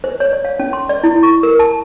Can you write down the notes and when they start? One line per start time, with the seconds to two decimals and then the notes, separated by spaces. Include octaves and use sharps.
0.04 C5
0.20 C#5
0.33 D5
0.45 F5
0.59 C#4
0.73 C6
0.89 D5
1.04 E4
1.23 C#6
1.43 A#4
1.59 A5